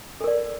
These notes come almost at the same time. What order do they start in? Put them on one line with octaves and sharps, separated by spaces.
A4 A#4 D5